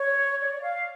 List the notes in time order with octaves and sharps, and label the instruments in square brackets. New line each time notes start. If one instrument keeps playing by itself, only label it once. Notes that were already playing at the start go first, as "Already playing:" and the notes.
Already playing: [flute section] C#5
D5
F5